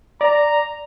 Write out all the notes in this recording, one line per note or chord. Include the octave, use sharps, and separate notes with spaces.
D5 A#5